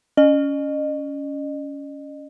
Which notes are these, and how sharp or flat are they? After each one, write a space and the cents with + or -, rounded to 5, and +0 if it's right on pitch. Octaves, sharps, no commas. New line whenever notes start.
C#4 +20 D#5 -35